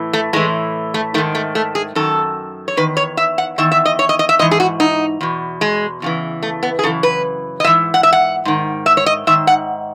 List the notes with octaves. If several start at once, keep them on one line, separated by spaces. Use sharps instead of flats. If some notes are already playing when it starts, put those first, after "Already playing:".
Already playing: A2 E3
A3
A2 E3 G#3
A3
G#2 D#3 A3
A3
A3
G#4
F#2 D#3 A4
C#5
E2 D#3 B4
C#5
E5
F#5
E2 D#3 E5
E5
D#5
C#5
D#5
D#5
E5
G#2 E3 D#5
G#4
F#4
D#4
E2 B2
G#3
E2 C#3 E3
A3
B3
G#4
F#2 C#3 E3 A4
B4
D#5
G#2 E3 E5
F#5
E5
F#5
G#2 D#3
E5
C#5
D#5
G#2 D#3 E5
F#5